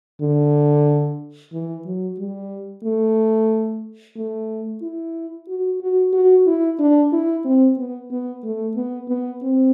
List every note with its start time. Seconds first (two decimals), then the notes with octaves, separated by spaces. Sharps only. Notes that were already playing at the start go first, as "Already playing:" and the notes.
0.22 D3
1.53 E3
1.86 F#3
2.19 G3
2.84 A3
4.17 A3
4.82 E4
5.48 F#4
5.81 F#4
6.13 F#4
6.47 E4
6.80 D4
7.13 E4
7.45 C4
7.78 B3
8.12 B3
8.44 A3
8.76 B3
9.09 B3
9.43 C4